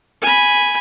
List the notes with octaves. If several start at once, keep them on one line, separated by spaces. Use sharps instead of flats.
G#5 B5